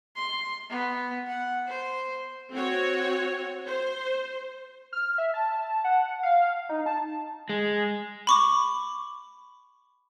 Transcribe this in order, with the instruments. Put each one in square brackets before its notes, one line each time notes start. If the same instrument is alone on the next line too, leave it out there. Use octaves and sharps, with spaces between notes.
[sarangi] C6
B3
F#5
C5
[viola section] C4 F#4 C#5
C5
[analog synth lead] F6
E5
A5
F#5
F5
D#4
A5
[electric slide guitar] G#3
[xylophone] B5 C#6 D6